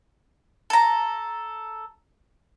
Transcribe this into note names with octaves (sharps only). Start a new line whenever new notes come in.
A4 A#5